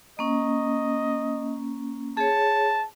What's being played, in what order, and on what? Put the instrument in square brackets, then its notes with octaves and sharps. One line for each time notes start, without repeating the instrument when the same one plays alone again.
[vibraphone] A#3 C#4 [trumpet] D#5
[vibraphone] G#4 C#5 [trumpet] A5